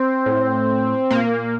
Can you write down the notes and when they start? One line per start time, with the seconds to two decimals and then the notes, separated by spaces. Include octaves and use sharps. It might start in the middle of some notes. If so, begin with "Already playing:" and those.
Already playing: C4
0.26 A2
1.11 A#2 A#3